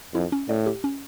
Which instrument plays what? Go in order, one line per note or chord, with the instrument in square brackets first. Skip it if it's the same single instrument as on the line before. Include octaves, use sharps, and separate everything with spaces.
[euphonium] F2 [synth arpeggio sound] E4
[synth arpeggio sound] C#4
[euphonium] A2 [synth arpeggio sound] D5
[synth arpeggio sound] G4
C#4